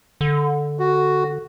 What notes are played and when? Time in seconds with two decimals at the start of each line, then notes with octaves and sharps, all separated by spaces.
0.21 D3
0.79 F#4